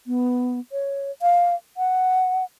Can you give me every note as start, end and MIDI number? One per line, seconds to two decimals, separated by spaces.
0.07 0.60 59
0.72 1.11 73
1.22 1.55 77
1.77 2.44 78